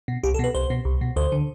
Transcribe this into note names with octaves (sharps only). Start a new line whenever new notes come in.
B2
C2 G4
A4
B2 B4
C2 C5
B2
C2
B2
D2 C5
D3